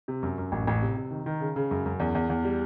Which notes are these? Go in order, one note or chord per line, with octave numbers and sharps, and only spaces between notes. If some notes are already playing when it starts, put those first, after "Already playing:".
C3
F#2
F#2
A1
A1
C3
C3
D#3
D#3
C#3
C#3
F#2
F#2
E2
E2
E2
G3